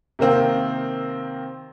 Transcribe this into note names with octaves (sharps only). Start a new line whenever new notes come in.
C3 D#3 A#3 C4